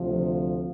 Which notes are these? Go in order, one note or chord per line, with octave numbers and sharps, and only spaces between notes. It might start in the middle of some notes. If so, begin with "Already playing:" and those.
Already playing: D2 C3 F3